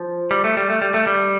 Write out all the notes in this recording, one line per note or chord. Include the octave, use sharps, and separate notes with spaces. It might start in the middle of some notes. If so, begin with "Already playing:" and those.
Already playing: F3
G3
A3
G3
A3
G3
A3
G3